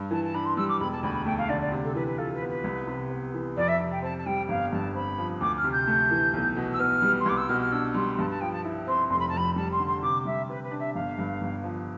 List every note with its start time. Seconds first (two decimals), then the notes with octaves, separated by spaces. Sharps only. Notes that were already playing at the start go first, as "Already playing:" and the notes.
Already playing: G2
0.11 E3 A5
0.24 A5
0.34 D4 B5
0.45 C6
0.57 G3 E6
0.68 D6
0.80 E1 B5
0.92 A5
1.03 D2 B5
1.14 B5
1.26 A3 G5
1.38 F5
1.49 D3 D5
1.61 D5
1.72 C3
1.84 A4
1.95 E3 B4
2.07 B4
2.18 F4 A4
2.34 B4
2.41 B3
2.49 B4
2.64 C2
2.88 C3
3.10 B3
3.34 E3
3.56 F2 D5
3.68 E5
3.80 C3
3.91 G5
4.02 C4 A5
4.18 A5
4.26 G3 G5
4.48 G1 F5
4.72 G2 A5
4.94 C4 B5
5.18 F3
5.41 D2 D6
5.57 F6
5.64 C3
5.72 G6
5.87 A3
6.11 E3
6.34 B1
6.56 B2
6.73 E6
6.79 B3 F6
7.02 G3
7.20 C6
7.26 C2 D6
7.37 E6
7.48 B2 F6
7.61 F6
7.72 D4 E6
7.94 G3 C6
8.18 G2 A5
8.30 A5
8.40 F3 G5
8.53 A5
8.65 E4
8.87 C4 C6
9.10 F1 C6
9.19 B5
9.29 A5
9.33 F2 B5
9.56 G3 A5
9.72 C6
9.80 D3
9.87 C6
10.02 C3 D6
10.25 G3 E5
10.49 C3 B4
10.64 B4
10.72 D4
10.79 E5
10.94 G1 F5
11.18 G2
11.41 G1
11.64 F3